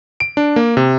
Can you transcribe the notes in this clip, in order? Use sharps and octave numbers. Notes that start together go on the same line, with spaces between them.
D7
D4
A#3
C3